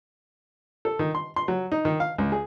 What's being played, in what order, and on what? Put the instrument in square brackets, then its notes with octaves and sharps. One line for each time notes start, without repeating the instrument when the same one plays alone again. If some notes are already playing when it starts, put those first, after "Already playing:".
[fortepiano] A4
D#3
C6
C6
F#3
D#4
D#3
F5
C#2
G#4